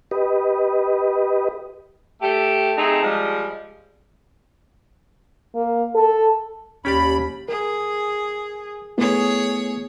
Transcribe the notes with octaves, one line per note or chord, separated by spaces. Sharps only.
G4 B4 D#5
A3 G4
A3 C4 D#4 G#4
F3 G3 G#3
A#3
A4
D#2 C#4 G4 D5 B5
G#4 A#4
A3 B3 E4 G#4 C#5